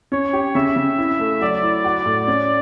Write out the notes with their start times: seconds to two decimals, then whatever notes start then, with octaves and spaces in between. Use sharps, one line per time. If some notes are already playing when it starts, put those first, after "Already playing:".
0.12 C#4 C#5
0.33 G4
0.55 C#3 E5
0.76 C#3
0.98 E4
1.19 A3
1.41 F#3 D5
1.63 E4
1.84 F#4
2.06 A2
2.28 C#4